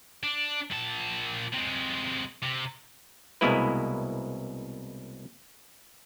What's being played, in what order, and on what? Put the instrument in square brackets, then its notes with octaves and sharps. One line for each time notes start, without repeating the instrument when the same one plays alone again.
[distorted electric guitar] D4
A#2 A5
C3 G#3
C3
[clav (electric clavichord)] C2 B2 G#3 A#3 E4 B4